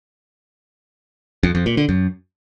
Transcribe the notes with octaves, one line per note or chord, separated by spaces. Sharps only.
F2
F2
A#2
D3
F#2